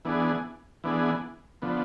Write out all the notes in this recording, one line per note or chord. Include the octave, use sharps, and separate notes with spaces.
E3 B3 D4 G#4
E3 B3 D4 G#4
D3 F3 B3